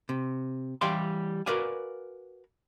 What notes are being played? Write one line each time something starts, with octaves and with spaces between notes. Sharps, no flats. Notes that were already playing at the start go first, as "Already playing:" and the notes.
C3
E3 G3 G4 D5 F5 C6
F#4 A#4 B4 D5 F5 G#5